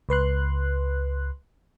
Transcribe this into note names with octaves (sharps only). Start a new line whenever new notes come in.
C#2 B4 C6 F#6